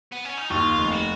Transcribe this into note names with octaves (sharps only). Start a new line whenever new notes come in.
B3
C#4
D#4
D#2 F4
F1
F#4